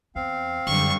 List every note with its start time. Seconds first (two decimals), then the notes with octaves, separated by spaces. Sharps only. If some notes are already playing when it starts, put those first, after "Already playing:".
0.15 E2 C4 F5
0.67 F#2 D3 G3 C#6